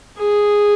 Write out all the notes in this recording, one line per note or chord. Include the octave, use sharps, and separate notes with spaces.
G#4